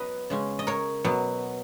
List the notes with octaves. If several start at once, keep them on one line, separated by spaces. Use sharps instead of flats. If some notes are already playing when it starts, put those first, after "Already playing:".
Already playing: F#3 B3 B4 D#5
C#3 G#3 C#4
D#5
A#4 C#5
B2 F#3 B3